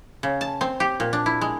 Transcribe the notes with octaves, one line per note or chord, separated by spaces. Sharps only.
C#3
A5
C4
G4
A#2
D4
E4
G#3